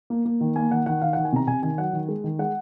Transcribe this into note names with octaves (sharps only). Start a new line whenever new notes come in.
A#3
A#3
D#3
A#3 G#5
D#3 F#5
D#3 F#5
D#3 F5
D#3 F#5
G#5
C3 A#5
C3 G#5
D#3 G#5
F#3 F#5
D#3
G#3
D#3
G#3 F#5